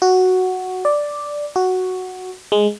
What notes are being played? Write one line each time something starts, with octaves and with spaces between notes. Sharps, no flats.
F#4
D5
F#4
G#3